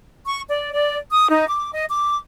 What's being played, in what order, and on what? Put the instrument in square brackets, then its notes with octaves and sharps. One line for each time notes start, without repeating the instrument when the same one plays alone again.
[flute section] C#6
D5
D5
D#6
D#4
D6
D#5
D6